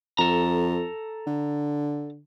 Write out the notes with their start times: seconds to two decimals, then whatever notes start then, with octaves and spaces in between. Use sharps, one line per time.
0.18 F2 A4 A#5
1.27 D3